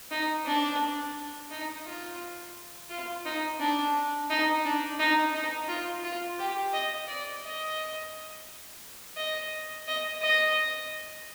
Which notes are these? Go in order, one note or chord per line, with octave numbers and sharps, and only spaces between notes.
D#4
D4
D#4
F4
F4
D#4
D4
D#4
D4
D#4
D#4
F4
F4
G4
D#5
D5
D#5
D#5
D#5
D#5